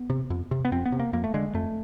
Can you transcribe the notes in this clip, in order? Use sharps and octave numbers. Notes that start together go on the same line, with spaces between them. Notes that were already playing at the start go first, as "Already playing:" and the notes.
Already playing: B3
C3
F2
C3
B3
F2 C4
B3
C3
A#3
F2 A#3
A3
D3 G#3
F2 A3